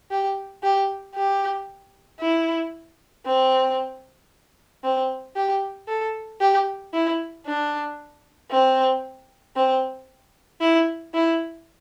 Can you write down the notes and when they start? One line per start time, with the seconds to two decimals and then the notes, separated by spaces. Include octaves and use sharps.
0.11 G4
0.63 G4
1.15 G4
2.21 E4
3.26 C4
4.84 C4
5.36 G4
5.88 A4
6.41 G4
6.93 E4
7.46 D4
8.51 C4
9.56 C4
10.61 E4
11.14 E4